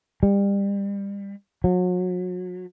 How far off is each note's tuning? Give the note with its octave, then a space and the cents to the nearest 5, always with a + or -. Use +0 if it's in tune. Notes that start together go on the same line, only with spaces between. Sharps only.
G3 +30
F#3 -35